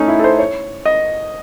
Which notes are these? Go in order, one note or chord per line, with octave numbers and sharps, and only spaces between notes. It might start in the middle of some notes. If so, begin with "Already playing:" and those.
Already playing: A3 C#4 D#4
E4
A4
C5
C#5
D#5